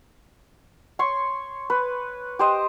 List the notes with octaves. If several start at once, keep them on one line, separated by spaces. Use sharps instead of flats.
C#5 C6 C#6
B4
G4 C5 D#5